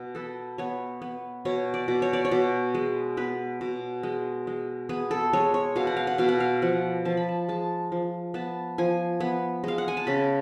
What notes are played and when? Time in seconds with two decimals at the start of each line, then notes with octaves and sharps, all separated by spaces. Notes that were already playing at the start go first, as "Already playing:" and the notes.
Already playing: B2
0.15 B3 A4
0.58 B3 C#5
1.02 B3
1.45 B2 C#5
1.74 D5
1.88 B2
2.02 C#5
2.13 D5
2.25 C#5
2.31 B2
2.74 G#3
3.17 B3 B4
3.61 B2
4.03 G#3
4.47 G#3
4.89 B3 G#4
5.11 A4
5.33 G#3 C#5
5.54 C#5
5.76 B2 F5
5.87 F#5
5.97 F5
6.07 F#5
6.18 B2 F5
6.28 F#5
6.40 F5
6.62 F3 F#5
7.05 F3 A5
7.17 B5
7.29 A5
7.49 G#3 A5
7.92 F3
8.34 B3 A5
8.78 F3 G#5
9.20 B3
9.64 G#3 F5
9.78 F#5
9.88 G#5
9.97 A5
10.07 C#3 B5